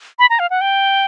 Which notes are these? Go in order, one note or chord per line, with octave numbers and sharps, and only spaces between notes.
B5
A#5
F5
F#5
G5